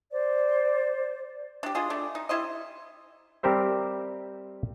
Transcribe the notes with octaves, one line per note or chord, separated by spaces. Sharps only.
C5 D5
D4 G4
D4 F4 G#4 D#5
A3 D4
D#4
G3 E4 C5 D#5
G3 C4 G4 A#4 C5 E5